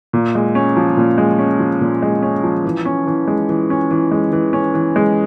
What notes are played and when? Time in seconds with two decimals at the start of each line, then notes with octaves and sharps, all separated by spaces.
0.13 A#2
0.35 G#3
0.55 C#4
0.76 F3
0.97 A#2
1.18 G#3
1.39 C#4
1.60 F3
1.81 A#2
2.03 G#3
2.22 C#4
2.44 F3
2.64 E3
2.85 C#4
3.07 E3
3.28 G#3
3.49 E3
3.70 C#4
3.91 E3
4.12 G#3
4.32 E3
4.53 C#4
4.74 E3
4.96 G#3